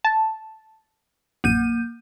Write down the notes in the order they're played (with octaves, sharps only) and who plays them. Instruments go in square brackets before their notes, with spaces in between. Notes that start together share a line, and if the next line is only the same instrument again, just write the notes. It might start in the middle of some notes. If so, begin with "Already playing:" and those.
[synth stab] A5
[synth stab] A#1 F#2 [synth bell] A#3 G6 D#7